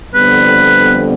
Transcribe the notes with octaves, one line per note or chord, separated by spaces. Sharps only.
F2 D3 G3 B3 B4